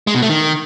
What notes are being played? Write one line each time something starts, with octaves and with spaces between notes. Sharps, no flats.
G#3
B2
A3
D#3